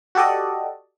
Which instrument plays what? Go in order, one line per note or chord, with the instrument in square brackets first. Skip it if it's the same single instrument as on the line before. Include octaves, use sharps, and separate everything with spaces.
[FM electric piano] F#4 G4 A4 D5 D#5